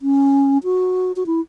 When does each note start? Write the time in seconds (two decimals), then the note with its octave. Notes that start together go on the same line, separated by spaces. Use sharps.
0.02 C#4
0.64 F#4
1.16 F#4
1.26 E4